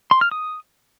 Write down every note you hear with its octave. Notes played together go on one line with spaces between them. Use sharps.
C6
F6
D#6